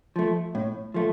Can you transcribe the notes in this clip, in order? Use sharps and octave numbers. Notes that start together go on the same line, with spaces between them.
F3 A3
A2
F3 A3